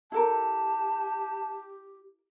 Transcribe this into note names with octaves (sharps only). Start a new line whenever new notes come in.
E4 G4 A4 A#4 A5